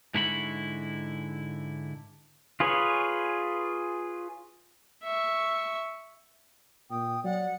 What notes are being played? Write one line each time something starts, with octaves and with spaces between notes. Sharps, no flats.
G#2 D3 E4 F#4 A#5 B5
F4 G#4 B4 C#5
E5 C#6
A#2 G5 D#6
F#3 D5 F#5